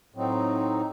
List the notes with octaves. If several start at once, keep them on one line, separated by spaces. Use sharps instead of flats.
A2 F#3 C4 D#4